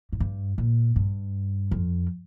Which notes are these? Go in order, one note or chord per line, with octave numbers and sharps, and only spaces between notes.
A2
G2
A#2
G2
F2